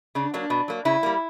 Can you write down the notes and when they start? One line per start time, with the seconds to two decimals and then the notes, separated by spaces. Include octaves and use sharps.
0.15 C#3 D4
0.34 F#3 A#3 D4
0.50 B2
0.68 F#3 A#3
0.85 C#3 E4
1.03 G3 A#3